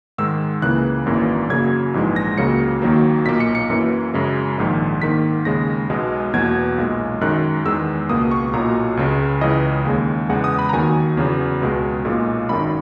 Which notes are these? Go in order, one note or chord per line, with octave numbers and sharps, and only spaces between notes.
G#2 D#3 G#3 E6
C#2 C#3 E3 A#3 F#6
G#1 F#2 E3 A#3
F#2 C#3 F#3 A#3 G#6
A#1 G#2 E3 G#3
A#6
C#2 C#3 F#3 A#3 C#7
D#2 D#3 F#3 A#3
B1 A#2 A#3 B6
C#7
C#7
F#2 E3 A#3
F#2 C#3 G#3
A#1 G#2 D#3
G#2 D#3 A#3 B6
D#2 C#3 G#3 A#6
B1 B2 G#3
E2 B2 F#3 A#3 G#6
B1 A#2 G#3
F#2 D#3 G#3 F#6
E2 D#3 G#3 E6
C#2 B2 A#3 D#6
C#6
B1 A#2 F#3 A#5
C#2 C#3 G#3
C#2 C#3 E3 D#5
D#2 C#3 G#3
E2 C#3 G#3 F#5
D#6
B5
A#5
D#2 D#3 F#3 G#5
E2 C#3 F#3
C#2 B2 G#3
B1 A#2 G#3
G#1 F#2 D#3 B5